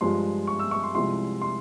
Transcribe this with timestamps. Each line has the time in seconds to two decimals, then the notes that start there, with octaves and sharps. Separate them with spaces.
0.01 G2 F3 G#3 C6
0.47 C#6
0.59 E6
0.71 C#6
0.83 C6
0.95 C2 C3 F3 G#3 E4 C6
1.42 C6